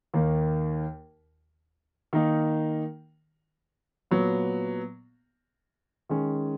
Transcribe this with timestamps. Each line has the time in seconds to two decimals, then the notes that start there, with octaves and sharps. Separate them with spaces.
0.14 D#2 D#3 A#3
2.13 D#3 A#3 D#4
4.11 A#2 F#3 B3
6.09 D#3 G#3 C#4